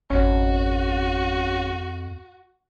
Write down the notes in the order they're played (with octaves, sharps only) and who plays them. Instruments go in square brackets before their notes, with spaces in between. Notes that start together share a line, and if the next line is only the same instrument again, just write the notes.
[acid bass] G#1 [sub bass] F2 [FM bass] C#4 [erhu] F#4